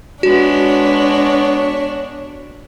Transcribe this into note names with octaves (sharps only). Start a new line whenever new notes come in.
G#3 B3 D4 F#4 C#5